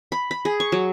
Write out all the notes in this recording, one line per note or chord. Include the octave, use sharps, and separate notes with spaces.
B5
B5
G#4
C#6
F#3